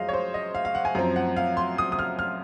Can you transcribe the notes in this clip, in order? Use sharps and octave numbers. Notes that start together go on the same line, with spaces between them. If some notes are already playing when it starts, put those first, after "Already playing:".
Already playing: F#2 F3 G#3 C5 D#5 F5
C#5
C5
D#5
F5
F5
F#5
G#5
F#2 F3 C4 A#5
F#5
F5
C6
D#6
D#6
F6
F6